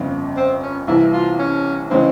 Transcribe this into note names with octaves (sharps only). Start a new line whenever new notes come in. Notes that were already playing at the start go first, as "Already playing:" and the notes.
Already playing: G1 F2 C#3
C4
C#4
C2 C3 E3 E4
F4
C#4
C#3 E3 G#3 C4 C#4